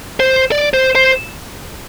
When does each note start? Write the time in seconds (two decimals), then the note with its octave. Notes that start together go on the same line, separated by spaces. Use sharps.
0.20 C5
0.52 D5
0.74 C5
0.95 C5